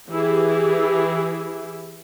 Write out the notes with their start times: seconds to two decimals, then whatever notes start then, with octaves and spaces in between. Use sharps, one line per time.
0.11 E3 E4 G4 G#4